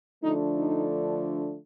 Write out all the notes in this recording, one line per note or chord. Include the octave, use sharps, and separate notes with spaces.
D3 F3 A3 D4 D#4
D#4